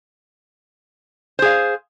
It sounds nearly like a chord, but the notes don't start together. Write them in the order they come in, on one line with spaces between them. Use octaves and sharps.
C5 G#4 F5